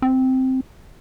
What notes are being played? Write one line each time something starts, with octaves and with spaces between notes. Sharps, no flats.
C4